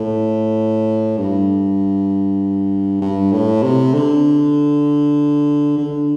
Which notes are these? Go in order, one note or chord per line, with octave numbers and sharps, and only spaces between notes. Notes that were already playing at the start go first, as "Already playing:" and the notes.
Already playing: A2
G2
G2
A2
C3
D3
D3